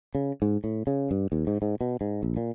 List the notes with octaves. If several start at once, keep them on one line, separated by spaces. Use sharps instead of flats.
C#3
G#2
A2
C#3
G2
D#2
G#2
G#2
B2
G#2
A#1
A#2